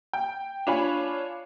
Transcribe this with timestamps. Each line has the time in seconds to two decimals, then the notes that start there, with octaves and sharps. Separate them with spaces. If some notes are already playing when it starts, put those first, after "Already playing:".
0.13 G5
0.67 D4 F4 C#5 G#5 B5